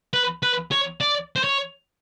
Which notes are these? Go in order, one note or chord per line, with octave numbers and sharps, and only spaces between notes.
B4
B4
C#5
D5
C5
C#5